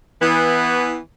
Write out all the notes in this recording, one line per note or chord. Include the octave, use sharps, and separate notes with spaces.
E3 B3